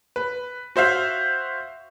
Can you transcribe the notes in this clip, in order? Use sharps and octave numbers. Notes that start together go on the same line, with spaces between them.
B4
F#4 C5 E5 F5